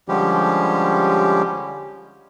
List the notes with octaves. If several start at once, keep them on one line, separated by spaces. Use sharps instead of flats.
D3 F3 G3 G#3 C#4 G4